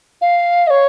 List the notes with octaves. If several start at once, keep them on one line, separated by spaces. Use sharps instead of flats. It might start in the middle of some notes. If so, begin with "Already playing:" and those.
F5
D#5
C#5